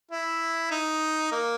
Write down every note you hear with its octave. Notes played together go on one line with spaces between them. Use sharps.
E4
D#4
A#3